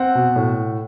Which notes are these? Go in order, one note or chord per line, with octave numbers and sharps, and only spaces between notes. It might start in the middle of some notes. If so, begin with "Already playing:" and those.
Already playing: C4 F#5
B2
A2